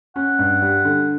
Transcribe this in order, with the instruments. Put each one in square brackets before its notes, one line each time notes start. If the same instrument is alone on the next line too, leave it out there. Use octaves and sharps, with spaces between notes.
[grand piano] C#4 [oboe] F#5
[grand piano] G2
G3
D3